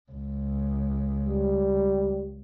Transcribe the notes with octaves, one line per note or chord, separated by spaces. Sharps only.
C#2
G3